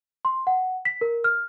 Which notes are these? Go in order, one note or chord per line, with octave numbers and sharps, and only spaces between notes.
C6
F#5
B6
A#4
F6